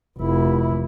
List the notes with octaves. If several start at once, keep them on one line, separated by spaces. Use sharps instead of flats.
F1 E4